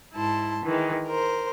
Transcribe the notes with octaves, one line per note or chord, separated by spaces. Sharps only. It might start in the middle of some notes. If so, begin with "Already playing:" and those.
G#2 E4 A5 C6
D#3 E3 G#3
A#4 C5